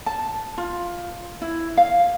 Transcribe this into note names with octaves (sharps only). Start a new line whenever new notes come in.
A5
F4
E4
F5